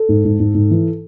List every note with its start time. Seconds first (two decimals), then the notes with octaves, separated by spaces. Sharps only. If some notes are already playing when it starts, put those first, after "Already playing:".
Already playing: A4
0.09 G#2
0.25 G#2
0.40 G#2
0.55 G#2
0.71 E3